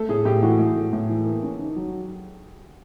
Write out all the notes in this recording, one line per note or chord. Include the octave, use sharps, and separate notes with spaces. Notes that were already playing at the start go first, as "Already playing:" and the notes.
Already playing: A3 A4
A2 G#4
A2 G4
E3 F#4
A3
A2
A2
E3
A#3
C#4
D#3
F#3